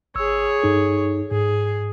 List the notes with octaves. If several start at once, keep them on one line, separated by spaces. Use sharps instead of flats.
G#1 G#4 C#5 E6
G2 D#4 A4
G#2 G#4